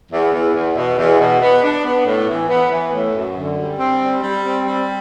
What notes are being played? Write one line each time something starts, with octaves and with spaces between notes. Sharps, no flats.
E2
E2
E2
B2
E2
B2
B3
D4
B3
A2
E3
B3
E3
A2
F#2
D3
G3
C4
G3
G3
C4
G3